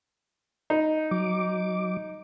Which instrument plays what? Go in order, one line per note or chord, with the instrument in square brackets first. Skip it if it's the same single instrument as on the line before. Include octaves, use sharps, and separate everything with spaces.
[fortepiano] D#4
[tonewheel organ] F#3 D6